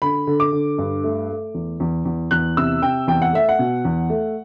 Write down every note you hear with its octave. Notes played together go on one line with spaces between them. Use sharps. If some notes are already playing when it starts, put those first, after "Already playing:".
D3 B5
D3
D6
D3
G2
A3
A3
E2
E2
E2
E2 F#6
C3 E6
C3 G5
E2 G5
F#5
A3 E5
F#5
B2
E2
A3